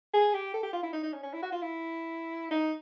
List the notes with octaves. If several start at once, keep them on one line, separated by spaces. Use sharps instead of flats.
G#4
G4
A4
G4
F4
E4
D#4
D#4
C#4
C#4
E4
F#4
F4
E4
D#4